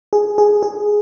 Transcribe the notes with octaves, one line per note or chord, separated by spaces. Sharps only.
G#4
G#4
G#4